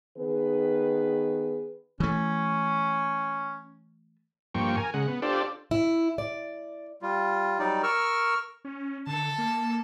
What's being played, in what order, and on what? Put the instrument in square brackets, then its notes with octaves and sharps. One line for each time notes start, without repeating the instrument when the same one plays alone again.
[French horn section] D#3 B3 G#4 B4
[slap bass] E3 A3 [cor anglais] C#4
[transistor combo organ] G2 F3 A#3 G5 C#6
A#4 G#5
C#3 G#3 F#5
B3
D4 F4 G4 A4 C5 D5
[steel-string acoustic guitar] E4
D5
[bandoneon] G3 F4
F#3 G3 D#4 D5
A#4 C#6 E6 F6
[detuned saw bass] C#4
[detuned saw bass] D3 [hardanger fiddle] A4 A5
[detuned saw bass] A#3